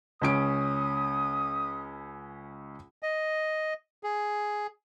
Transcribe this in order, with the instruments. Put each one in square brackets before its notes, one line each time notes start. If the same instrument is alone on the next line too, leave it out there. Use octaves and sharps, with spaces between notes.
[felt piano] C#2 C#4 D7 [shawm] D#6
[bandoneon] D#5
G#4